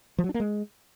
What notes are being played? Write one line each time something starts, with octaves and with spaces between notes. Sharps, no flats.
F3
F#3
D4
A#3
G#3